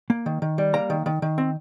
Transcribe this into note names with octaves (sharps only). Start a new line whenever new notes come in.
A#3
D#3
D#3
G3
A#3 A#5
D#3
D#3
D#3
C4